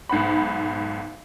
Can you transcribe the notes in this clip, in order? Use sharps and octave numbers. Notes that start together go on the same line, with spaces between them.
B1 G#2 F#5 B5